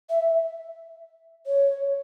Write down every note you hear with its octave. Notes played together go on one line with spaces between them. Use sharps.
E5
C#5